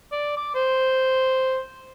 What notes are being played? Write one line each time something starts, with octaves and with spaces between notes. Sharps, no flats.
D5
D6
C5